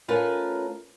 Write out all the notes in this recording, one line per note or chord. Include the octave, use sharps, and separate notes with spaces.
A3 C#4 F4 A#4 B4